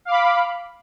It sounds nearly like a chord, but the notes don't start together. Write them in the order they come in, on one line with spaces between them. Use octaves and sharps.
F5 D6 B5